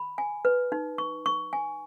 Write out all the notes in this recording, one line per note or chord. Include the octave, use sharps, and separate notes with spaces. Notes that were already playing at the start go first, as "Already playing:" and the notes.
Already playing: B5
G#5
B4
D#4
C#6
C#6
G#5